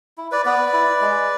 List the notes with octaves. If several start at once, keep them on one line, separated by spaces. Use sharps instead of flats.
E4
B4 D5
B3 B4 D5
E4
G#3